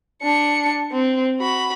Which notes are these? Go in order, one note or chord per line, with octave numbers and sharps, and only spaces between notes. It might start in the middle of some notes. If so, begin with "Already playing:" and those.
D4 C#7
C4
F#4 B5